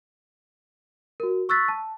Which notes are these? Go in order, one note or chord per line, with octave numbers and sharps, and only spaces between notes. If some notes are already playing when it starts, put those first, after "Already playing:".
F#4 A#4
C#6 E6 F#6 A6 B6
A5